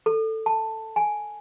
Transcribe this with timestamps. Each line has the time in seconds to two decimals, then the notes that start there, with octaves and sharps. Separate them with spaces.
0.06 A4
0.46 A5
0.96 G#5